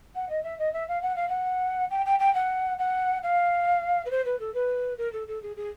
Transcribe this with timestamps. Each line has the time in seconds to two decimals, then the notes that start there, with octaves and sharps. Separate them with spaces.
0.15 F#5
0.29 D#5
0.43 E5
0.58 D#5
0.73 E5
0.88 F5
1.02 F#5
1.16 F5
1.28 F#5
1.90 G5
2.05 G5
2.19 G5
2.34 F#5
2.78 F#5
3.23 F5
4.05 B4
4.10 C5
4.25 B4
4.39 A4
4.54 B4
4.98 A#4
5.12 A4
5.27 A4
5.42 G#4
5.56 G#4